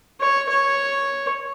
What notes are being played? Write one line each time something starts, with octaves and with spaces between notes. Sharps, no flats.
C#5
C#5